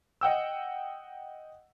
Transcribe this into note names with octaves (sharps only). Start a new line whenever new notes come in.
D#5 F#5 G5 E6